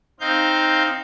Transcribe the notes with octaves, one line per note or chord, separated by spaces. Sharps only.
C4 D#4 F5 G6